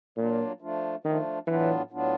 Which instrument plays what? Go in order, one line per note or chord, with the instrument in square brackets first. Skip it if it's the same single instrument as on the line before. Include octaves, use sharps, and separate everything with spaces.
[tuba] A#2 [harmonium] F#3 A#3 D4 F4
[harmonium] F3 A3 D4 F4
[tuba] D#3 [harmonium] F3 A3 D4 F4
[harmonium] A2 F#3 B3 D4 F4 [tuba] E3
[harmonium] A2 F#3 B3 D4 F4